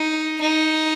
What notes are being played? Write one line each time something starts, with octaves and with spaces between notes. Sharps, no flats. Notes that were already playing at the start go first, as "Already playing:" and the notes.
Already playing: D#4
D#4